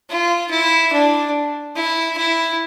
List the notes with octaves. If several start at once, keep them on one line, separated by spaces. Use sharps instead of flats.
F4
E4
D4
E4
E4